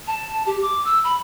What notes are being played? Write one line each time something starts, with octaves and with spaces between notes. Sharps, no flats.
A5
G4
D6
E6
B5